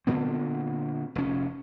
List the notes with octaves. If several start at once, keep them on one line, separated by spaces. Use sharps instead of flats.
A#2 D3 B3 C4
F1 C#4